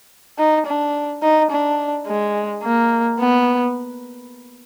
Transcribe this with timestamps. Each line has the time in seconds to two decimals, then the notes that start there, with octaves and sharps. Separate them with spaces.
0.38 D#4
0.66 D4
1.23 D#4
1.51 D4
2.07 G#3
2.64 A#3
3.20 B3